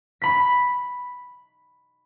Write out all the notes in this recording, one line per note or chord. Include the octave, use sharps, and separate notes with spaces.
B5 B6